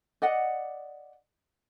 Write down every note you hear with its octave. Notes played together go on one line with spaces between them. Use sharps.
D5 D#5 F#5